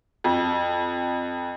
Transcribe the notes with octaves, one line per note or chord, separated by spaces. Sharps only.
F2